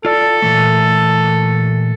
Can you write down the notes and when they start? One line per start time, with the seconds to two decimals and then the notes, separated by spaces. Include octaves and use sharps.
0.05 F4 A4 D5
0.42 A#2 E3 A3